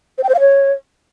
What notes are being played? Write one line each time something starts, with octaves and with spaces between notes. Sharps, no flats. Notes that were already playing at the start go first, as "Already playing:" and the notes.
C5
G5
C5
F5
C#5